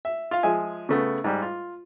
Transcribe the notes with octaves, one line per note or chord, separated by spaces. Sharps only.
E5
F4 F5
F3 G#3 E5 G#5
C#3 A3 B3
G#2 G3
F4